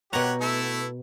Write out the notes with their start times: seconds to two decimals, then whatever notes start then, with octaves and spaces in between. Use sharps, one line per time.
0.13 B2 G4 C#5 F#5 A#5
0.41 A3 E4 A4